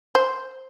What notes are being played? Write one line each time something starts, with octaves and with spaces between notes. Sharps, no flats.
C5